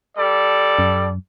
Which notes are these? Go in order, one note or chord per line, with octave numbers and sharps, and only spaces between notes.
G3 A4 D5
F#2